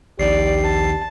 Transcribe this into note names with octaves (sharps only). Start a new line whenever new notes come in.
A#1 D#2 D#3 G4 D5 C7
A5